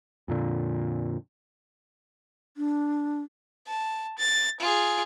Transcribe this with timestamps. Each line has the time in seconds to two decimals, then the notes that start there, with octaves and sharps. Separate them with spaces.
0.28 F2 A#2 D3
2.57 D4
3.67 A5
4.18 A6
4.60 F4 G#4